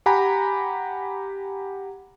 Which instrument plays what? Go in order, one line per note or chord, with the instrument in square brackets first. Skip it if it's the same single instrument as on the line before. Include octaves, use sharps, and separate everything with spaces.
[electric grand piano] G4 F#5 G#5 A#5 B5